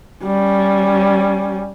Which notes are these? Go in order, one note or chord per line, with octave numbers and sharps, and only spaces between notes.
G3 C#4